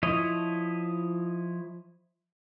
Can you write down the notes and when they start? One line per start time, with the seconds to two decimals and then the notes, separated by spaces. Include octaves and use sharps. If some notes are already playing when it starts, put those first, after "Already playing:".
0.03 F3 E4 C#5 D#5